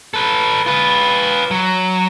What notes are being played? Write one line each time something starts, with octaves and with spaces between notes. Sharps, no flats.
A4 B4
F4 B4
F#3